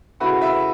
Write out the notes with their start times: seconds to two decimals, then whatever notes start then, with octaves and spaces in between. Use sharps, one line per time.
0.20 C#3 A3 E4 F#4 B4
0.41 B4 E5